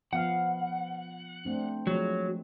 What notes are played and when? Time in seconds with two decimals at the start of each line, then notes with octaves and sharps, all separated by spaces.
0.13 F3 B3 F5 F#5
1.45 A3 C4 D4
1.87 F3 F#3 G#3 A3